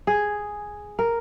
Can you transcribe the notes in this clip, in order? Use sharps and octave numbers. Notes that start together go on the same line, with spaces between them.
G#4
A#4